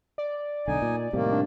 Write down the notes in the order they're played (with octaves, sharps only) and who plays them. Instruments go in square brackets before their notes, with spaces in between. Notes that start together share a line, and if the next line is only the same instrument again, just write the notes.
[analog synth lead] D5
[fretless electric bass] B1 D3 [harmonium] D#4 G#5
[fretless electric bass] A#2
[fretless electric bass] A2 C3 G3 [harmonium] D#3 A#3
[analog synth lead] D4